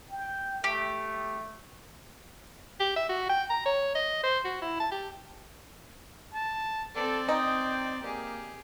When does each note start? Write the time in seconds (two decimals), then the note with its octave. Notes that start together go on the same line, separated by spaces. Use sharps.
0.10 G5
0.64 A3 G4
2.80 G4
2.96 E5
3.09 F#4
3.29 G5
3.50 A#5
3.66 C#5
3.95 D#5
4.23 C5
4.44 F#4
4.62 E4
4.80 A5
4.91 G4
6.34 A5
6.95 C4 A4 D5
7.29 D#4 G5
8.02 A#3 G4 G#4